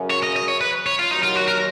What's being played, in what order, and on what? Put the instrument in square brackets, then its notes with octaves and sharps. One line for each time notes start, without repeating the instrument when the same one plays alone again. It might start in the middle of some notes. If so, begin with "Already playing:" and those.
Already playing: [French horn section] F#2 C#3 F#3 C#4
[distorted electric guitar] C#5
D#5
D#5
C#5
B4
C#5
F4
[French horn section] D#2 D#3 F#3 [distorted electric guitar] D#4
[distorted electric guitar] F4
F#4
A#4